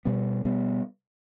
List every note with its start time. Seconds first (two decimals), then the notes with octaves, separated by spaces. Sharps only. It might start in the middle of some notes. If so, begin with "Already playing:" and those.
0.05 B2 G3 B3
0.45 B2 G3 B3